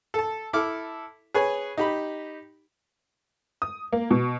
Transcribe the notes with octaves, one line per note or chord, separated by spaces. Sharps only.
A4 A5
E4 A4 D6 F6
G#4 B4 C#5 G#5
D#4 G4 B5
D#6
A#3
B2